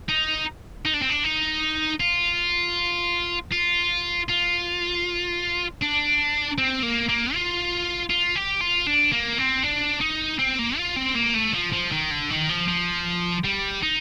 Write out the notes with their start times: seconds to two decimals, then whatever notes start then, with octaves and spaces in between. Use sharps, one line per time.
0.09 D#4
0.85 D#4
0.94 D4
1.02 C4
1.10 D4
1.24 D#4
2.00 F4
3.52 F4
4.29 F4
5.82 D4
6.58 C4
6.83 A#3
7.09 A#3
7.34 F4
8.10 F4
8.36 G4
8.61 F4
8.87 D4
9.12 A#3
9.38 C4
9.63 D4
10.01 D#4
10.39 C4
10.59 A#3
10.77 F4
10.96 C4
11.15 A#3
11.35 A3
11.54 F3
11.73 F3
11.92 D#3
12.11 D3
12.30 D#3
12.49 F3
12.68 F3
13.45 G3
13.83 D#4